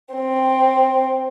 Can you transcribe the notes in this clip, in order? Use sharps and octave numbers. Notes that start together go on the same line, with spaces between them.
C4